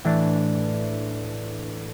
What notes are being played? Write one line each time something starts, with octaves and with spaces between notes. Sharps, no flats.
A2 E3 A3 D4